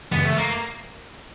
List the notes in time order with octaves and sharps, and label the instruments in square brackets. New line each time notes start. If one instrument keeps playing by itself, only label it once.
[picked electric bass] F#2 C#3 E3 G#3 [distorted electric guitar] B3
[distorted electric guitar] A3
A#3